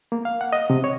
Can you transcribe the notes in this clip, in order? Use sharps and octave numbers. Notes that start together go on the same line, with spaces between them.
A#3
F5
F#5
D#5
C3
C#5